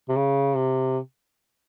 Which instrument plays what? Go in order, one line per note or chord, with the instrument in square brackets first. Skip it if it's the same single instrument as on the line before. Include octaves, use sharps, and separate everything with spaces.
[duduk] C3
C#3
C3